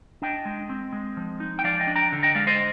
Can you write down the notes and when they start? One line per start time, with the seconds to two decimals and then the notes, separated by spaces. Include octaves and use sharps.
0.22 D4 D#5 G5
0.45 G#3
0.69 C4
0.93 G#3
1.17 F3
1.40 D#4
1.59 G5
1.64 F3 D5 F5
1.80 D#5 G5
1.87 D4
1.96 G5 A#5
2.12 D3
2.23 D#5 G5
2.35 G#3 D5 F5
2.47 C5 D#5